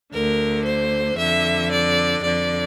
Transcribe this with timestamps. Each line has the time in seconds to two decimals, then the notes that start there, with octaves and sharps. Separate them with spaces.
0.12 D2 D3 A#4
0.65 C5
1.17 F2 D3 E5
1.71 D5
2.22 F2 D3 D5